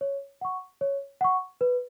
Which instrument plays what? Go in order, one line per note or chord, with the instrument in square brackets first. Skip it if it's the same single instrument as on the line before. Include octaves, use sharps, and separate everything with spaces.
[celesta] C#5
F#5 C#6
C#5
F#5 C#6
B4